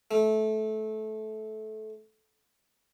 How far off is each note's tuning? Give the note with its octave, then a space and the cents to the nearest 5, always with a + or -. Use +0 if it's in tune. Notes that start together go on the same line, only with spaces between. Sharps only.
A3 -20